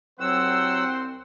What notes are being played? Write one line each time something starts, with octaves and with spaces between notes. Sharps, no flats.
C2 F#3 C4 C5 F#5 G5 C6 E6